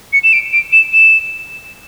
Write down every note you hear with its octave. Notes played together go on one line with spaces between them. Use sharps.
C#7
E7
D7
D7
E7
E7